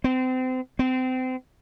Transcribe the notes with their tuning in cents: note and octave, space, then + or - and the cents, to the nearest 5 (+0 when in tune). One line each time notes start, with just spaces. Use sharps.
C4 -30
C4 -30